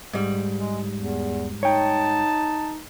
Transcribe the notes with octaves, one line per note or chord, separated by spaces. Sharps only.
G#2 G3
G#3
E2
D#4 C#5 G5 A5